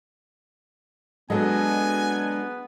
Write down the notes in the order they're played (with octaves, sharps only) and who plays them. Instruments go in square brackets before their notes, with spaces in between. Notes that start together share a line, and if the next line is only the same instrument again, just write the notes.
[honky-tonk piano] F#3 A4 D#5 [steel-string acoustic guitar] G#3 D4 [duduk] B3 [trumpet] G#5